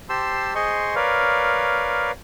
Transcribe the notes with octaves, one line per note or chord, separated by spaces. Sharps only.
G4 C5 A5 C6 E6
G#4 C5 D#5 C6 C#6
A#4 B4 C#5 D5 F5